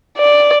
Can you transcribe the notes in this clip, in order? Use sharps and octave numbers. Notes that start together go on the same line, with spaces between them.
D5